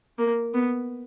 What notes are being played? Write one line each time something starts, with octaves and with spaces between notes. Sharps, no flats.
A#3
B3